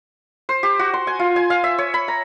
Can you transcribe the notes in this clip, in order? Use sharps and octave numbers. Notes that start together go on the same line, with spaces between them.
C5
G4
F#4
C6
G#5
F4
G#5
F5
E5
C#5
B5
A#5